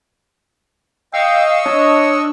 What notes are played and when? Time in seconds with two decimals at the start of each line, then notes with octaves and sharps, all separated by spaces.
1.14 D#5 F5 G5 C#6 E6
1.66 D4 C#5